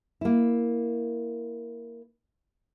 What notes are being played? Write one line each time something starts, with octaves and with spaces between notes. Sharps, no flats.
A#3 E4